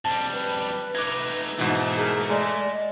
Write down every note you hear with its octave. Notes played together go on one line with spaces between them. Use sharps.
F2 G3 A5
B4
A3 D#4 D6 G#6
G#2 B2 E3 A3
G#4 A#4
G#3 D5